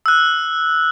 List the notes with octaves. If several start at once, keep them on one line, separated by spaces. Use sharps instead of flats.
E6 F#6